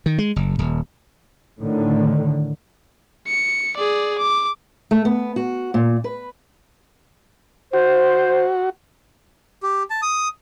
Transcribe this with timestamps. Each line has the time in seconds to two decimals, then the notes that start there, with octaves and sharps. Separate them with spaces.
0.06 D#3
0.18 G#3
0.36 F#1
0.59 D#1
1.60 A2 D3 D#3
3.28 C#7
3.77 G#4 D5
4.19 D6
4.91 A3
5.05 B3
5.36 F#4
5.74 A#2
6.04 B4
7.73 F#4 C5
9.63 G4
9.90 A5
10.02 D#6